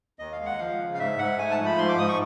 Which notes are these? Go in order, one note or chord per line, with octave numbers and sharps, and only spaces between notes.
D#2 D#5
F5
G#3
F#5
F3 F5
C#3
F5
G#2 E5
G#2 F#5
A3 G#5
A5
F3
B5
G#2 C6
D6
G#2 D#6
C#6